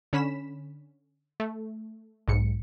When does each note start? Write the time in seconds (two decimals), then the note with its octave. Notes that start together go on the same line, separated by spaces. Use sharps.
0.13 D3 C#4 B5 B6 E7
1.40 A3
2.28 B1 G#2 C#7